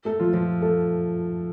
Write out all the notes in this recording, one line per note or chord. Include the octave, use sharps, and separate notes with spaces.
A3 A4
F3 F4
F3 F4
A3 A4